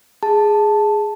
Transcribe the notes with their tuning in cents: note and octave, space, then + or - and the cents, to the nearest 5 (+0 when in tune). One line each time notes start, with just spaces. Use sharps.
G#4 +0 A5 +0